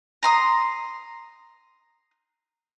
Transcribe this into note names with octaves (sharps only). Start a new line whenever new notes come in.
A#5 C6 D#6